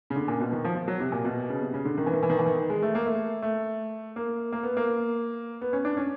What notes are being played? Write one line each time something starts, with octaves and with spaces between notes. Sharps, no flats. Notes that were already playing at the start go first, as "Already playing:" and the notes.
C#3
D3
A#2
B2
D#3
F3
F3
F#3
C3
A#2
B2
C#3
C3
C#3
D3
D#3
E3
D#3
E3
D#3
E3
D#3
G#3
A3
A#3
A3
A3
A#3
A#3
B3
A#3
B3
C#4
D4
C#4